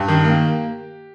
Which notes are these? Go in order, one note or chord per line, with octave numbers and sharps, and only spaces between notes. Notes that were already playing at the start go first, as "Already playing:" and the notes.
Already playing: G2 G4
D#3
A#3